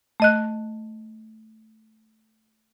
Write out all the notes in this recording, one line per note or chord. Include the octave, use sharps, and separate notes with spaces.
A3 D#5 F#6